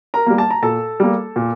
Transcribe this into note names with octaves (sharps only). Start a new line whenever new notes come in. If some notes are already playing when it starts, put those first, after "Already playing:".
A#4 A#5
G3 A#3
A5
A#5
A#2 A4 A5
G3 A#3
A#2